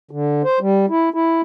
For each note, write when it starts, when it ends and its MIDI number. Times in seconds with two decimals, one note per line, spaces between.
0.11 0.42 50
0.44 0.59 72
0.60 0.86 55
0.89 1.09 64
1.14 1.42 64